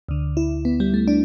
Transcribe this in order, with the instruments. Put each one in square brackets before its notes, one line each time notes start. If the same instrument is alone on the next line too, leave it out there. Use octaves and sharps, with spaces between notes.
[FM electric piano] D2 D3
E4
B3
G3
A3
D4